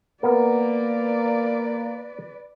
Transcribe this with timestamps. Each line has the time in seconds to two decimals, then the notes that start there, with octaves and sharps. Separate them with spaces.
0.23 A#3 B3 A#4 B4 D5